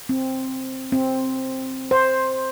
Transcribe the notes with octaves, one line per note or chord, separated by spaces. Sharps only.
C4
C4
C5